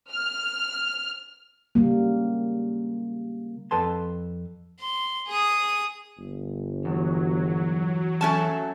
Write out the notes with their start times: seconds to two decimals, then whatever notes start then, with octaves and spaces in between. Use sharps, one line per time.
0.10 F6
1.75 C#3 G3 A#3
3.71 F2 A4 B4 A5 C6
4.80 C6
5.28 G#4 D#6
6.17 G1
6.85 E2 F#3
8.21 A3 C#4 A5